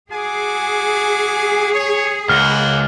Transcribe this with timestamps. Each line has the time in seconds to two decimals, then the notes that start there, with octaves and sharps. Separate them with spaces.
0.11 F#4 G#4 G#5 D6
1.74 C#5
2.29 C#2 A#3 F#5 F6